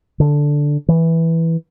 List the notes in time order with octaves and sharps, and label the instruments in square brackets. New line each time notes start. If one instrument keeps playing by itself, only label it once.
[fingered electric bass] D3
E3